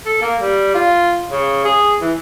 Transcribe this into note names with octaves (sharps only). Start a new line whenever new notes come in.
A4
A#3
G3
F4
C#3
G#4
E3